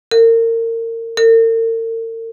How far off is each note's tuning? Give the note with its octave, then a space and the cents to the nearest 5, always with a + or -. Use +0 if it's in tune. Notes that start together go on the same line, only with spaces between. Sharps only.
A#4 -30
A#4 -45